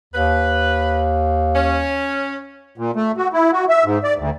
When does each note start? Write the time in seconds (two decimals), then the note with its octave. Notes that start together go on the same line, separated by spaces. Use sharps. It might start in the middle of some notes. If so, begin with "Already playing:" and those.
0.14 D#2 B4
1.54 C#4
2.78 A#2
2.96 A3
3.17 F#4
3.33 E4
3.53 F#4
3.69 E5
3.84 G#2
4.04 D5
4.18 D2